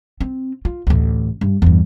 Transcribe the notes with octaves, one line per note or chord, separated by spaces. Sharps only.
C4
F4
A1 D2
G2
E2 G2